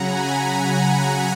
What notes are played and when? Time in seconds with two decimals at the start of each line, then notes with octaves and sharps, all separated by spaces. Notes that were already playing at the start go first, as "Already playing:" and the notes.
Already playing: C#3 F#3 F#5 G#5 A#5 B5
0.32 G#5 B5
0.72 F#5 A#5